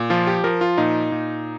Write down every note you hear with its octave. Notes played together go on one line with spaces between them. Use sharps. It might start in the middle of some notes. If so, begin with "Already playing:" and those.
Already playing: A#2
F3 F4
G4
F3 A#4
F4
A#2 D#4
A#2